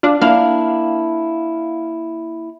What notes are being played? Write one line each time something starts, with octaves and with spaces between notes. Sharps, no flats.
D4 F4
A#3 D4 E4 F5